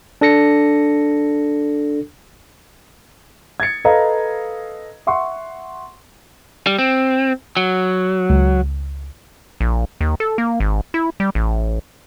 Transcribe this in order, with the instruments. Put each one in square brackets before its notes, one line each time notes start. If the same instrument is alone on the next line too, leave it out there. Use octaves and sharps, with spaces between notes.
[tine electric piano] D4 A4 A#6 C#7
[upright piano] G#6 A6 C#7
A4 B4 D#5 F5 A#5 D#6
E5 F#5 C6 C#6
[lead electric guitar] G3
C4
F#3
[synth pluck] C#2
[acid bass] A#1
D#2
A4
A#3
G#1
E4
G3
A1